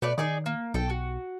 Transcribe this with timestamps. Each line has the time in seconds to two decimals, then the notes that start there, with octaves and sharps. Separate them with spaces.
0.02 B2 A3 B4 D5
0.18 D#3 D#4 G#4 D5
0.46 A#3
0.74 B1 A4 G5
0.90 F#4